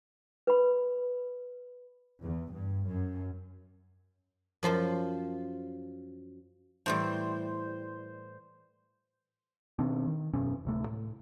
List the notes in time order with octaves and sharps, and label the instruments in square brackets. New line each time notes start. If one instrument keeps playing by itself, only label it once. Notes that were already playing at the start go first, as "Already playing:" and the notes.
[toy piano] B4 B5
[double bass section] E2
G2
F#2
[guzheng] F#2 F3 F4 C5
[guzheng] A2 E3 G3 [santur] C5
[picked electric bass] B2 D#3 C4 D4
D#3
E1 F#2 B2 C#4
D1 C3 A3
A2